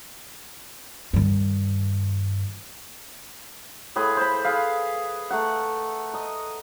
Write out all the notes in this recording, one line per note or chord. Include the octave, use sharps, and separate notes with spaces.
G2 D#3
A2 G#4 B4 C6
C5 B5
G#4 B4 F5
A3 A#4 F#5
A#4 D#5